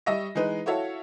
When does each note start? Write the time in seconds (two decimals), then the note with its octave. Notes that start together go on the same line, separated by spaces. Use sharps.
0.06 G3 D#5 E5 C#6 A#6
0.35 E3 G#3 D#4 B4
0.66 E4 F#4 A4 C#5 E5 F5